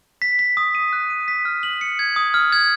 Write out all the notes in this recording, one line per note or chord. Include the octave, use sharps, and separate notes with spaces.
B6
B6
D#6
D#7
F#6
D#7
B6
F6
F#7
C#7
G#6
D#6
F6
G#6